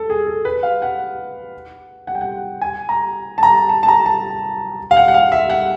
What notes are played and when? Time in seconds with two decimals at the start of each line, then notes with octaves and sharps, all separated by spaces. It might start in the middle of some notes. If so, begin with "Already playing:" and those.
Already playing: A4
0.10 G#4
0.27 A4
0.45 B4
0.63 F5
0.82 F#5
2.07 F#5
2.15 G5
2.21 F#5
2.61 G#5
2.89 A#5
3.38 A5
3.43 A#5
3.69 A5
3.83 A5
3.88 A#5
4.06 A5
4.91 F5
4.97 F#5
5.08 F#5
5.14 F5
5.32 E5
5.50 F#5